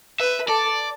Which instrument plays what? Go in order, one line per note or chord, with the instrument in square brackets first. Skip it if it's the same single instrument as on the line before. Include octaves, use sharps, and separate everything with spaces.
[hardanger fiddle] B4 [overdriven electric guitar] E5
[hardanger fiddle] A4 [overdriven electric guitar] D5